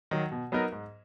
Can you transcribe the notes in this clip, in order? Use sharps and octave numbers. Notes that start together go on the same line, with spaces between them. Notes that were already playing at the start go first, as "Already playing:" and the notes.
D#3 F#3
B2
F#3 B3 D#4 A#4
G#2